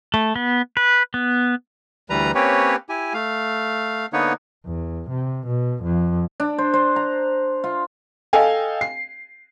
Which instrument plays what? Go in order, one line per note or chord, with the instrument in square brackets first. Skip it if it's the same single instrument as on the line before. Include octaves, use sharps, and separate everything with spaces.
[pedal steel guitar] A3
B3
B4
B3
[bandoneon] D2 E3 G3 B4 A#5
A#3 C4 C#4 G4 B4 C#5
E4 G4 G#5
A3 F5
D3 A#3 B3 D#4 B4 C#5
[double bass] E2
C3
B2
F2
[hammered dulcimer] D4
C5
C5
A#5
F4
[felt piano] A4 D#5 F5 G5 G#5
C7